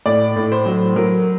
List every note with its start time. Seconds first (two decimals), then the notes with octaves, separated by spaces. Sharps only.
0.06 A2 D5
0.36 A2
0.52 C5
0.66 F#3
0.96 F#3 A#4